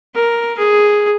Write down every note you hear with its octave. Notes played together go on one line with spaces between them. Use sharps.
A#4
G#4